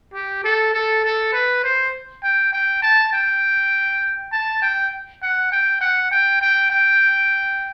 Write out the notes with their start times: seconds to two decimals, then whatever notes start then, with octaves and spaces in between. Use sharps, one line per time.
0.14 G4
0.44 A4
0.74 A4
1.04 A4
1.33 B4
1.64 C5
2.24 G5
2.53 G5
2.82 A5
3.13 G5
4.32 A5
4.62 G5
5.22 F#5
5.52 G5
5.81 F#5
6.11 G5
6.41 G5
6.70 G5